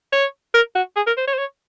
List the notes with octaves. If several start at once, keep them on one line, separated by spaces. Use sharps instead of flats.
C#5
A#4
F#4
G#4
A#4
C5
C#5
C5
C#5